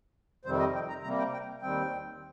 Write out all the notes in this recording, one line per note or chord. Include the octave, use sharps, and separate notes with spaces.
F2 C3 D#3 G3 C4 C5
D#5
G5
A#5
C3 G3 A#3 A#5
G5
G5
D#2 D#3 G3 C4 G5